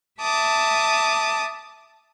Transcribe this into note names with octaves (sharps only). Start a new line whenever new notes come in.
E5 A5 D6 D#6